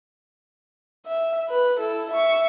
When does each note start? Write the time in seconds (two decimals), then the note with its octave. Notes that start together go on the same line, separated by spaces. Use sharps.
1.06 E5
1.49 B4
1.78 E4 A4
2.11 E5 C#6